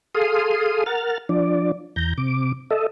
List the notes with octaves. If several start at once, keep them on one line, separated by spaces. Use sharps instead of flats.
G#4 A4 F5 C6 D#6
A#4 F#5 F6 A6
F3 D4 D5
E2 A#5 G6
C3 D6
A4 D#5 E5